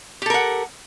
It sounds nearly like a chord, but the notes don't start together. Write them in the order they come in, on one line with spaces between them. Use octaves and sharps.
G4 A4 A#4 F#5